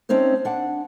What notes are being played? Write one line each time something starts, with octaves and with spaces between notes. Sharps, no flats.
A3 C4 C#4 D#4 C5
D4 F#5